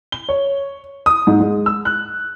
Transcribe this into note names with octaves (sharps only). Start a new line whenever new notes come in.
G7
C#5
D#6
G#2
G#3
E6
F#6